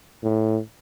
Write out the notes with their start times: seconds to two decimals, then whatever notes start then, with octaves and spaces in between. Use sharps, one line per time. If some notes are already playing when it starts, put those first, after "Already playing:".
0.23 A2